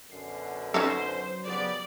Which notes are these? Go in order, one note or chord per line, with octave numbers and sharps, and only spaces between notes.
F#2 B2 D3 C7
F#3 C#4 D#4 A4 C5
C#3 G3 B3 D5